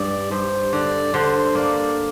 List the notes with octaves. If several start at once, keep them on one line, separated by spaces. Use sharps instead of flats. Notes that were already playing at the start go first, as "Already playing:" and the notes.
Already playing: G2 D5
G2 C5
D3 D5
D3 C5
A#3 D5